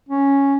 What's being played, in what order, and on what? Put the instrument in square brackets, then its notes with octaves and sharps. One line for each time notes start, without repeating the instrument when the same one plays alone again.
[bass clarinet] C#4